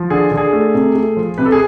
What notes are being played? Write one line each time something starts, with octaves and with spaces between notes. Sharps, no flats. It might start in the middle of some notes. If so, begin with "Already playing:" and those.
Already playing: F3
D3 G#4
D3
G#4
A3
C3
A3
F3
C3 B4
A4
G#4